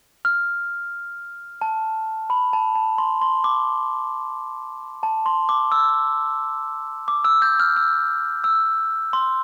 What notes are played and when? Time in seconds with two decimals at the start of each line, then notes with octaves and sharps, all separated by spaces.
0.25 F6
1.61 A5
2.30 B5
2.53 A5
2.75 A5
2.98 C6
3.22 C6
3.44 D6
5.03 A5
5.26 C6
5.49 D6
5.72 E6
7.08 D6
7.25 E6
7.42 G6
7.60 F6
7.76 E6
8.44 E6
9.13 C6